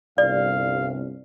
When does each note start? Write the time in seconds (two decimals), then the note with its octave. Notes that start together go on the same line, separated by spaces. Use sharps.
0.18 G1 C2 D5 F5